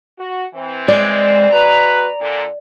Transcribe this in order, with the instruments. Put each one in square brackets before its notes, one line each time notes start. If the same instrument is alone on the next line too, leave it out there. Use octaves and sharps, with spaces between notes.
[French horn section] F#4
E3 C4
[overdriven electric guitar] G#3 [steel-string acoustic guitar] D5
[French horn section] G#3 F#4 B4 [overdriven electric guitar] A#5
[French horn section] A#2 D3